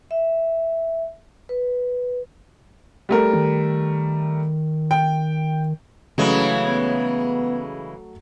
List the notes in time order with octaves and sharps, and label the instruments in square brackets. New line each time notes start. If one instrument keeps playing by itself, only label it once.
[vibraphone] E5
B4
[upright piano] G3 A3 A#4
[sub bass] D#3
[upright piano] G5
[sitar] C#3 E3 G#3 [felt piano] F#3 A3
[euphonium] B3